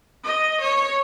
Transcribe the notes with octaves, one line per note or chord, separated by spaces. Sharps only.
D#5
C#5